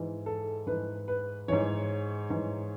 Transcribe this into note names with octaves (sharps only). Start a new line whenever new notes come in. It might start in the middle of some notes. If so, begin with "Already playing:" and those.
Already playing: G#2 E3
A4
G#2 E3 B4
B4
G#2 E3 C#5
G#2 E3